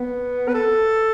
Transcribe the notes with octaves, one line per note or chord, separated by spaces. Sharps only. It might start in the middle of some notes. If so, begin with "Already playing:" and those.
Already playing: B3
B4
A4